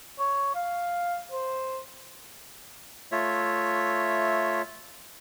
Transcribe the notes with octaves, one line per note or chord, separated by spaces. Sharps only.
C#5
F5
C5
A3 F4 C#5 E5